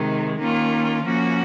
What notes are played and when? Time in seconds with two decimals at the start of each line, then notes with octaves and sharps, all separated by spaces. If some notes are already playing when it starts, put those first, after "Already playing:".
Already playing: C3 D#3 G#3
0.37 D#3 A#3 C#4 F4
1.02 F3 A#3 C#4 F#4